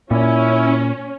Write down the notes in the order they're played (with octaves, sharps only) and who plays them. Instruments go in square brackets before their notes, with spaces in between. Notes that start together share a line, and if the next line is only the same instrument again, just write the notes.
[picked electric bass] A#2 [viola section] C#4 [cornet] E4